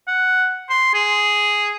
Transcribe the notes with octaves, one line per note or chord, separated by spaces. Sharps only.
F#5
C6
G#4